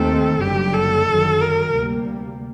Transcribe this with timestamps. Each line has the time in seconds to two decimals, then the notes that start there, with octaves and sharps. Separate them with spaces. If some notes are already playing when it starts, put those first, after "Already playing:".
Already playing: D#2 D#3 A3 C4 A4
0.40 F#1 F#2 D3 G3 G4
0.74 A4
1.08 G1 F#2 D#3 F#3
1.41 A#4
1.75 D2 C3 G3 A#3